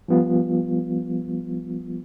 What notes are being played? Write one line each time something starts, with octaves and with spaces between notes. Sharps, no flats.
F3 G3 B3 F4